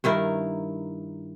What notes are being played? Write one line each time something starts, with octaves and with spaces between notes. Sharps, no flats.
G2 D#3 E4 A#4